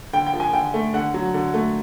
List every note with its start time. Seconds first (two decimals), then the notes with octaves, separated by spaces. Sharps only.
0.13 D3 G5
0.26 G5
0.33 F3
0.40 G#5
0.53 D3 G5
0.74 A3
0.94 D3 F#5
1.14 F#3
1.34 D3
1.54 A3